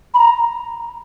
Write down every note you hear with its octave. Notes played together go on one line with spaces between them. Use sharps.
B5
A#5